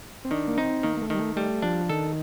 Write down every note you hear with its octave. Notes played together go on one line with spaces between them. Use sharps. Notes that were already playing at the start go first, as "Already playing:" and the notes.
C4
D#3 D4
A#3
C4 D#4
D#3 A#3
A#3
A3
D#3 G3
A3
G3 A3
F3 D4
D#3 A4